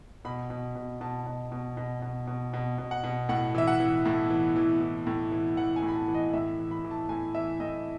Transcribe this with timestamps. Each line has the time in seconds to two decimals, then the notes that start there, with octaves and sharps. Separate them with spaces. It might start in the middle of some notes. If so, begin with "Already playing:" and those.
0.25 B2 B5
0.50 B2
0.76 B2
1.01 B2 A5
1.27 B2
1.52 B2
1.77 B2
2.02 B2
2.27 B2
2.54 B2
2.78 B2
2.91 F#5
3.04 B2
3.29 A2 F#5
3.55 E3 E5
3.67 F#5
3.80 E3
4.05 A2
4.30 E3
4.56 E3
4.81 E3
5.07 A2
5.32 E3
5.57 E3 F#5
5.76 G#5
5.82 A2
5.88 B5
5.95 A5
6.08 E3
6.15 D#5
6.33 A2 E5
6.59 E3
6.71 B5
6.85 E3
6.91 A5
7.09 A2 G#5
7.35 E3 E5
7.60 A2 D#5